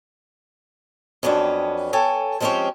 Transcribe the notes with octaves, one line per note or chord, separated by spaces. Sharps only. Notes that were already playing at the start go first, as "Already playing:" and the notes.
F2 F#3 B3 C#4 D4 G5
A4 C#5 G5 G#5
F3 G#3 C4 C#4 G4 C#5